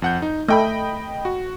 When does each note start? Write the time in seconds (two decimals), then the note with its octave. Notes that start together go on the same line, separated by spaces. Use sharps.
0.02 F2 F#5 G6
0.22 D#4
0.49 A3 D#5 G5 B5
1.25 F#4